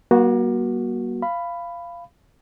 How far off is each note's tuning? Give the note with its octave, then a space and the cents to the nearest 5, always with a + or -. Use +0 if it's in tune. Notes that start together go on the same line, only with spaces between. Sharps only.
G3 -35 A#3 +35 F#4 +0
F5 -15 B5 +10